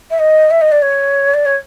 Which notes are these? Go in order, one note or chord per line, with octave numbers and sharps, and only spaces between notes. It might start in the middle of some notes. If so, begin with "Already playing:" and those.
E5
D#5
E5
D#5
D5
C#5
D5
C#5